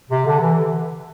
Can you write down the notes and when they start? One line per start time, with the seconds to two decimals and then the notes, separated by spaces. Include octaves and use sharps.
0.09 C3
0.25 D3
0.40 E3